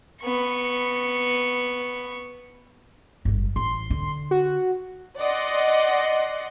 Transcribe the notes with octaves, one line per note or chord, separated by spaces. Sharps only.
B3 C#6
G1 F#2
A1 C6
D3
F#4
D5 D#5 F#5 C6